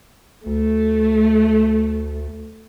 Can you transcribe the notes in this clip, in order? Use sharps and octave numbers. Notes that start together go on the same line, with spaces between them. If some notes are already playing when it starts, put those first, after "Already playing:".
D2 A3